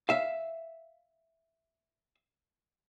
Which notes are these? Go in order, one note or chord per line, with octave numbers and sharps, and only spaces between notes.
E5 F5